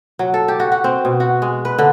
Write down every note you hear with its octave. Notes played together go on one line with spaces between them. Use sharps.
F#3
A4
G4
F#4
F#4
C4
B2
F#4
G#3
B4
D3